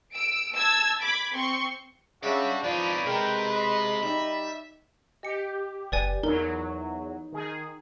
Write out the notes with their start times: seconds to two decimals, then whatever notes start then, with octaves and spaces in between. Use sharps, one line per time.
0.14 E6 D7
0.55 A5 E6 G#6
1.03 B5 D6 G#6
1.35 C4 C6 C#6
2.23 C#3 D4 F#4 D5 E5 G5
2.64 F2 F3 C#4 D#4 E4 B4 D5
3.06 C3 G#3 A#4 G5
3.51 D#5 B5
4.03 G3 D#4 E5
5.23 G4 D#5 C#7
5.92 F#1 B4 D5 G#5
6.23 E2 F#3 D#4 A#4
7.32 D#3 G#4